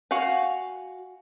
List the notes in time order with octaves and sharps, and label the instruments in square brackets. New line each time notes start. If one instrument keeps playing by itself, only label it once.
[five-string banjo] F#4 F5 G#5